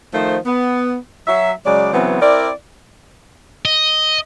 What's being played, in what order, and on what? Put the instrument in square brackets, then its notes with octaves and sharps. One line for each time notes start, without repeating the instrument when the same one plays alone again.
[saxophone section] D#3 F3 A3 C5
B3
F#3 E5
C#3 F#3 G#3 D5
C#3 E3 F#3 B3 C4
C4 E4 A#4 D5
[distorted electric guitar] D#5